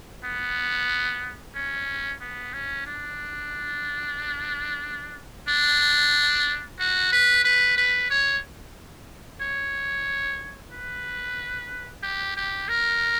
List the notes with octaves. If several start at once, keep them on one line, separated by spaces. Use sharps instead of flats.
B3
C#4
B3
C#4
D4
D4
F#4
B4
B4
B4
C#5
C#5
B4
G4
G4
A#4